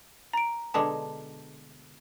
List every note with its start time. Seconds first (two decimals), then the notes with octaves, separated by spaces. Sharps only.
0.33 A#5 D7
0.74 B2 D3 G#3 A5